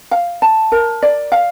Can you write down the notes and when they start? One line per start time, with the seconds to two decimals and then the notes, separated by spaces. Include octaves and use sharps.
0.11 F5
0.42 A5
0.72 A#4
1.02 D5
1.32 F5